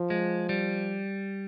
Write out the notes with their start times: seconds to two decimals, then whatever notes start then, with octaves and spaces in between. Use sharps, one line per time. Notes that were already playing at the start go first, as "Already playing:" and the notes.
Already playing: F3
0.10 G#3
0.49 G3